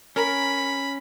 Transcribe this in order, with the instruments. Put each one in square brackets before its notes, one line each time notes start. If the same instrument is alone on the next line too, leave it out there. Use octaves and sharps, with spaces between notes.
[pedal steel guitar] C#4 [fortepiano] A#4 [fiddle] B5